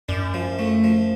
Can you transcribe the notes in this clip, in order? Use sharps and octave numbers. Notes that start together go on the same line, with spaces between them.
F#2 D4
F3
A3
F3